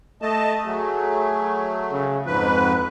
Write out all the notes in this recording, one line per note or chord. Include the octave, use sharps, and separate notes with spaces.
A3 D#5 A5
F#3 A3 G#4
C#3
F2 G#2 F3 B4